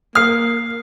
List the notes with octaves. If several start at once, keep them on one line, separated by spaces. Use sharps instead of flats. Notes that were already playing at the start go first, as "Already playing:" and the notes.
A#3 D#6 F6 C7